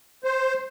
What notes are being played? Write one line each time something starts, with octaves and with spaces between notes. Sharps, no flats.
C5